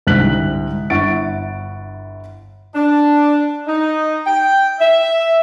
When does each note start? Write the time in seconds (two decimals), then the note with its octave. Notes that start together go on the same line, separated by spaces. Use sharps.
0.07 C2 G#2 D3 F#6 B6 F#7
0.90 G1 E4 F#5 C#6 A6 D7
2.74 D4
3.66 D#4
4.26 G5
4.80 E5